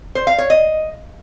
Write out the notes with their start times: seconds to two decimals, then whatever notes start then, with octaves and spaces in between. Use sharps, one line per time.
0.15 C5
0.27 F5
0.38 C#5
0.50 D#5